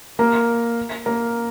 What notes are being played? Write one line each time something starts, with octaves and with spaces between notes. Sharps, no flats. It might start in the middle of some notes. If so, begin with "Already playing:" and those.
A#3 A#4
A#3 A#4